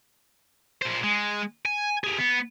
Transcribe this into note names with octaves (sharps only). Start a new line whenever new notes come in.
A#2 C5
G#3
G#5
G4 G#4
B3